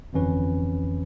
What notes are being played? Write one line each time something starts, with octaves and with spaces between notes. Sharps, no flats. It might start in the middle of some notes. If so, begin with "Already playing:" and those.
G1 F2 E3 C#4 B4